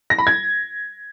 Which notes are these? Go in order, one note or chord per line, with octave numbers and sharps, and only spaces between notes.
A#6
B5
G#6